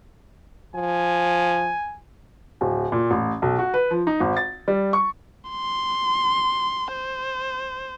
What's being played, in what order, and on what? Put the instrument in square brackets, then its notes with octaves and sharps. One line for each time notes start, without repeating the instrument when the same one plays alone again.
[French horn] F3 [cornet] G#5
[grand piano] D1
A#2
A1
B1
F#4
B4
F3
D#4
G#1
A6
G3
C#6
[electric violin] C6
C5